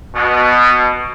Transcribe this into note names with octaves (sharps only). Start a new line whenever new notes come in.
B2